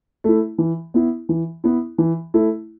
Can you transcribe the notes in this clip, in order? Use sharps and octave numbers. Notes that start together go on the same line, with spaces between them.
A3 E4
E3
B3 E4
E3
B3 E4
E3
A3 E4